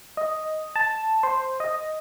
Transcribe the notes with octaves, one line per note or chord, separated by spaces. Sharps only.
D#5
A5
C5
D#5